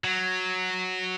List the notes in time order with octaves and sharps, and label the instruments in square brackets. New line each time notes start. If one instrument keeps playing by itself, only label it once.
[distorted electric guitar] F#3